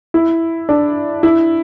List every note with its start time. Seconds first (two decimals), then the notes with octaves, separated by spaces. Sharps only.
0.14 E4
0.69 D4
1.23 E4